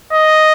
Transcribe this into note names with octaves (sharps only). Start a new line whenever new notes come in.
D#5